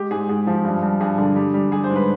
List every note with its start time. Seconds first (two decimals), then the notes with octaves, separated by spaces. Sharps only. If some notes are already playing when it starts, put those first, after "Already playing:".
Already playing: G#3 G4
0.11 G#2 G#4
0.29 G#2 G#4
0.47 F3
0.65 G2
0.82 G2
1.00 G2 G#4
1.18 D3
1.36 G3
1.54 G3
1.71 G3 G#4
1.84 C5
1.90 G#2
1.96 B4